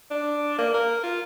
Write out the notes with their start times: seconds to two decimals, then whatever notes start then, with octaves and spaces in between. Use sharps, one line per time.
0.11 D4
0.58 A#3
0.74 A#4
1.03 F4